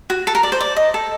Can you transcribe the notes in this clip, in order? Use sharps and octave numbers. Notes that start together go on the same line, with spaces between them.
F#4
A4
A#4
D5
C5
D5
D#5
A4